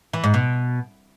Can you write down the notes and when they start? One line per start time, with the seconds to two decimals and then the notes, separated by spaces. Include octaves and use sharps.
0.13 E3
0.24 G#2
0.34 B2